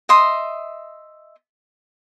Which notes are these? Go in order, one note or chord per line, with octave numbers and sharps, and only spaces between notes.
D#5 E5 C6 D#6